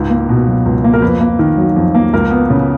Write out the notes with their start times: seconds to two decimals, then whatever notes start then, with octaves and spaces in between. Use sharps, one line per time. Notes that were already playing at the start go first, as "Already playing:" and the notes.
Already playing: C#2 G#2
0.10 A#3
0.29 B2
0.48 F#3
0.66 C#2
0.84 A#3
0.93 A#4
1.02 F2 B4
1.20 A#3
1.39 D#3
1.58 F#3
1.76 F2
1.94 A#3
2.13 C#2 A#4
2.31 B3
2.50 C#3